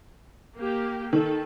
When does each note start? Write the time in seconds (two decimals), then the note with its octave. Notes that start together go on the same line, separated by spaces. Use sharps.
0.56 A#3 G4
1.13 D#3 A4